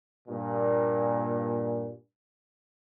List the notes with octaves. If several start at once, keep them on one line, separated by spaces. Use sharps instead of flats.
G2 A#2